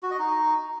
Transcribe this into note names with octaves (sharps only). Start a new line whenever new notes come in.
F#4
D#5
D#4